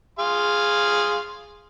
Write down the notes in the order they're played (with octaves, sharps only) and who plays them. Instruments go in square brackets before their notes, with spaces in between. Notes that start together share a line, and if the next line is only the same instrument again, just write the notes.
[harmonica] G#4 F5 C6